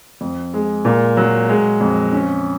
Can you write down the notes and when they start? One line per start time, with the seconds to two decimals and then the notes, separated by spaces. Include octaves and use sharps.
0.21 F2
0.54 G#3
0.85 A#2
1.17 F#3
1.49 G#3
1.81 F2
2.12 C#4